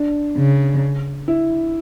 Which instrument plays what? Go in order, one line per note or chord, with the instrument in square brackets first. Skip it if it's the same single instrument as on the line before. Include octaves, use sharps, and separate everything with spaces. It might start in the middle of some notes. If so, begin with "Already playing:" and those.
Already playing: [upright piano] D4
[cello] C#3
[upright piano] E4